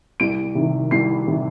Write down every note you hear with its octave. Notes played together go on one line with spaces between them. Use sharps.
C2 D7
C3 D#3
C2 C7
C3 D#3